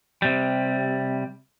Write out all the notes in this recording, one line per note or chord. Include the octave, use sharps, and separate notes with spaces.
C3 G3